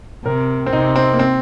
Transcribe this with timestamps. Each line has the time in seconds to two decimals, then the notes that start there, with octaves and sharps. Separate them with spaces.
0.25 C3 A#4
0.66 C4
0.72 C3 D#4
0.96 C4
1.14 A#3
1.19 C4